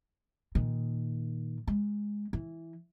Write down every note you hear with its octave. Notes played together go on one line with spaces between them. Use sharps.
A#2 D#3
G#3
E3